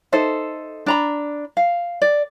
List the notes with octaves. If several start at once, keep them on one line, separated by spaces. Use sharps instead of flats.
D#4 A4 C5 E5
D4 A#5 B5
F5
D5